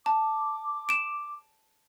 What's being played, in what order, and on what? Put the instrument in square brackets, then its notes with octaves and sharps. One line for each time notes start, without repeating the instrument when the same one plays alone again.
[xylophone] A5 [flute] D6
[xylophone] D7 E7